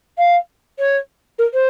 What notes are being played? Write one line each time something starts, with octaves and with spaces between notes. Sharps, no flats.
F5
C#5
A#4
C5